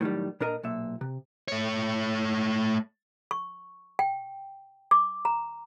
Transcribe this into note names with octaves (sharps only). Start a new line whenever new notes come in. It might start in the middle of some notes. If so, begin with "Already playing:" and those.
A2 D#3 F#3 G3
A#2 D4 A#4 D#5 A#5
B1 A#2 E5
C3
A3 C#5
C#6
G5
D6
A#5